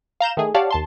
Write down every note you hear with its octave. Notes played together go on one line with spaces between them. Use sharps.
F5 A#5 G6 E7
D#3 A3 G#4
G4 C#5 D5 F5 F#5 A5
D#2 A5 C6